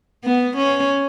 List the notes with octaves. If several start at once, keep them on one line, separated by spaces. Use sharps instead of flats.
B3
C#4